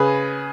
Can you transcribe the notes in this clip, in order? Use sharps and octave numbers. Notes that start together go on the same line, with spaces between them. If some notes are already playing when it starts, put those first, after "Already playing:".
Already playing: C#3 G#4 B4